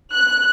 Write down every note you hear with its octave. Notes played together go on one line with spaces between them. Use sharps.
F#6